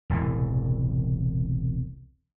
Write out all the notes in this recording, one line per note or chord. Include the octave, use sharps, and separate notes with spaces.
E1 C2 A2 E3